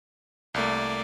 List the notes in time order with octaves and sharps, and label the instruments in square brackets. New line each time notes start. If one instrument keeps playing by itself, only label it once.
[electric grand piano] C2 A3 [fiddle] A#3 D5